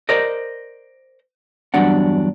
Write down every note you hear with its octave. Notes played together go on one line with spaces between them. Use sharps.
A#4 C5 D5 D#5
E2 G2 F#3 D4 F#5